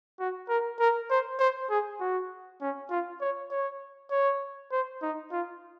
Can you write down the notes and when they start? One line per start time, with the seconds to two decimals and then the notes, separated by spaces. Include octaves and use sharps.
0.20 F#4
0.49 A#4
0.80 A#4
1.11 C5
1.40 C5
1.70 G#4
2.00 F#4
2.62 C#4
2.90 F4
3.21 C#5
3.51 C#5
4.11 C#5
4.72 C5
5.02 D#4
5.32 F4